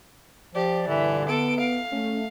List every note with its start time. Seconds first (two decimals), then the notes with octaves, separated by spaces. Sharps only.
0.55 F3 G4 D5
0.88 G2 A#2 D3 E3
1.29 B3 A4 D7
1.60 F5
1.92 A3 C#4